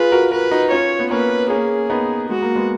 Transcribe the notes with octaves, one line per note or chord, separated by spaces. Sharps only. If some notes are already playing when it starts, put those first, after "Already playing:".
Already playing: F4 G#4 B4
F#4 A#4
F#4 A#4 B4
D#4 F#4
C#4 F4 C#5
B3
A#3 C#4 B4
A#3 C#4 G#4
B3 D#4
G#3 F#4
A#3
G#3 B3